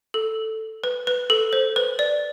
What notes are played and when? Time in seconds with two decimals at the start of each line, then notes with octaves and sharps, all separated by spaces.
0.14 A4
0.84 B4
1.07 B4
1.30 A4
1.53 C5
1.76 B4
1.99 D5